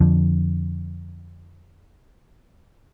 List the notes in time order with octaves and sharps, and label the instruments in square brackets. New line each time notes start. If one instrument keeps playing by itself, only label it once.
[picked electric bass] F2 D3 F3